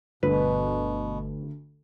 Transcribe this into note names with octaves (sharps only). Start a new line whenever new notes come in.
G1 D2 G2 B2 B4